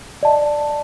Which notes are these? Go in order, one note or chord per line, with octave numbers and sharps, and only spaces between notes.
D5 D#5 A5